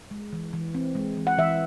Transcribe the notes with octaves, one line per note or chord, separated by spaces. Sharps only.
G#3
E3
E3
C4
G#3
E3
F#5
E3 E5